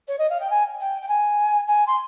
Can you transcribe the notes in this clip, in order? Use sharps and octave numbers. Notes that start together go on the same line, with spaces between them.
C#5
D#5
F5
G5
G#5
G5
G5
G#5
G#5
C6